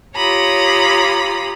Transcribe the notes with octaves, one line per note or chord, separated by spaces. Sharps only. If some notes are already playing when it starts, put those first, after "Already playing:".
F4 G4 C#5 A#5 B5 D#6